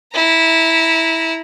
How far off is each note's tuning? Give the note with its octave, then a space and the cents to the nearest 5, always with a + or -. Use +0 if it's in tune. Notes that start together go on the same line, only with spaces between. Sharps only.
E4 -15 A#5 +0